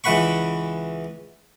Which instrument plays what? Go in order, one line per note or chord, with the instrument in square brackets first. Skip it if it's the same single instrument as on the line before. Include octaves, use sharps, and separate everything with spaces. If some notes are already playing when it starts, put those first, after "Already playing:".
[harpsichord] C#2 E3 B4 F#5 B5 C#6